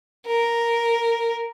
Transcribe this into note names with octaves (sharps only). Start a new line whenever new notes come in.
A#4